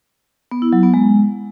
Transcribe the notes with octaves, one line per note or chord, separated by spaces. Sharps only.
B3
E4
F#3
B3
G#3